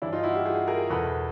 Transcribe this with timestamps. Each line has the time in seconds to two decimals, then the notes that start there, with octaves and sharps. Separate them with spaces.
0.02 G2 E3 D4 E4
0.12 D#4 F4
0.23 E4 F#4
0.34 F4 G4
0.46 F#4 G#4
0.67 G#4 A#4
0.90 E2 B2 A4 B4